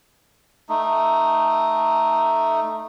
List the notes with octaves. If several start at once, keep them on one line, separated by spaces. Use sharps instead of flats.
A3 D#4